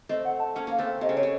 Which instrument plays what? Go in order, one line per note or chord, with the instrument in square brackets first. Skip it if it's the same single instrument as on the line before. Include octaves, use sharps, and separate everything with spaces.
[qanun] A3 C4 [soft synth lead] D#5
[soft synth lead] F#5
A5
[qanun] A#3 C#4
[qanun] A#3 C#4 [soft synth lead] F5
[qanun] A3 C4
[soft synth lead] F5
[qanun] C3 [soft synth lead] D#5
[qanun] C#3
[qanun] C3 [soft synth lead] C#5
[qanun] C#3